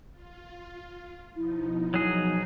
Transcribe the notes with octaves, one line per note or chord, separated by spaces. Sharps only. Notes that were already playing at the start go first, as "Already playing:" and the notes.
F4
B2 F3 D#4 E4
F#3 G#4